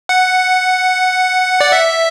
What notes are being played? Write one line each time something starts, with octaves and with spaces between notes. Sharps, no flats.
F#5
D5
E5